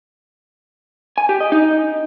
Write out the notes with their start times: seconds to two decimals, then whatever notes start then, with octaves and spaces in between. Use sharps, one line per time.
1.18 G#5
1.29 G4
1.41 D#5
1.52 D#4